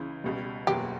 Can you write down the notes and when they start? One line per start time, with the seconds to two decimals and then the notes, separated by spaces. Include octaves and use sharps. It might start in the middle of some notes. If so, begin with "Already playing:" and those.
Already playing: C#2 C#3 E3
0.24 C#2 B2 G3
0.67 F#1 E2 B2 F#3 B3 G4